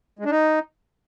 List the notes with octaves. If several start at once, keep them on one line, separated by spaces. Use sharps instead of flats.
G#3
D4
D#4